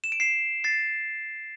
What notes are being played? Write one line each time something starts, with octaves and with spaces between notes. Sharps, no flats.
E7
D7
C7 E7
A6 C7